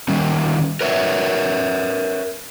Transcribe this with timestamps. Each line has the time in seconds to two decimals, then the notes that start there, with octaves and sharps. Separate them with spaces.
0.08 D#3 G3 C#4
0.81 A#4 B4 C#5 E5